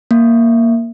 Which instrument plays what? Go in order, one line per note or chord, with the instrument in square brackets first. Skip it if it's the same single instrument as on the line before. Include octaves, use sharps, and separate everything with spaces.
[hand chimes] A#3